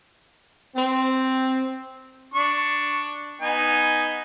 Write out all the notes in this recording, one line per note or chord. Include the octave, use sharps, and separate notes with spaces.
C4
D4 C#6
B3 D#4 G#5